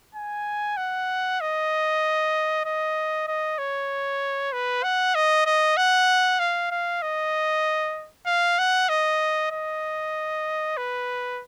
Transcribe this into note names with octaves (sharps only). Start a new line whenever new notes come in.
G#5
F#5
D#5
D#5
D#5
C#5
B4
F#5
D#5
D#5
F#5
F5
F5
D#5
F5
F#5
D#5
D#5
B4